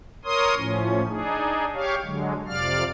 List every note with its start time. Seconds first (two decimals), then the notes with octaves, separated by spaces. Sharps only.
0.25 A#4 C#5 C6 D#6
0.55 A2 F3 C#4
1.09 D4 D#4 G#4
1.74 G4 C#5 F5
2.04 D3 F#3 G#3
2.47 F2 C3 D5 F5 F6